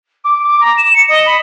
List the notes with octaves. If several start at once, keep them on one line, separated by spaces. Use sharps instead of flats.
D6
D6
A#5
E7
C#7
D#5
B5